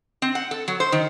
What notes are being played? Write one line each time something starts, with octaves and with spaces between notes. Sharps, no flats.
C4
F#5
A4
F#3
C5
D#3